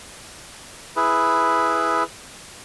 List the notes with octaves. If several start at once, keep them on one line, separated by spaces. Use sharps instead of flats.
E4 G#4 B4